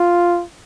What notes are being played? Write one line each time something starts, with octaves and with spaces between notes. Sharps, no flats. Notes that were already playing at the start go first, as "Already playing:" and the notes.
Already playing: F4